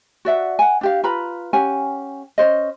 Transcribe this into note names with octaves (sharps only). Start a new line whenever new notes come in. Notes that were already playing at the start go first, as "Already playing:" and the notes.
F#4 D5 E5 F#5
F#5 G#5
D4 G4 F5
F4 B4 A#5 B5
C#4 G4 F#5 G#5
C#4 D4 C5 D#5